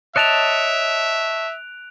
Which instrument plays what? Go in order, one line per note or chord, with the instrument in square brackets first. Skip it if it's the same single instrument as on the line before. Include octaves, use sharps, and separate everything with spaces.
[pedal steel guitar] C#5 D#5 A5 [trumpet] E5 [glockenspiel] F#6 D7 F7